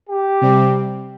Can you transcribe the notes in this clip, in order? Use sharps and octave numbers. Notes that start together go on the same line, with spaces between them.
G4
C3 G3 C4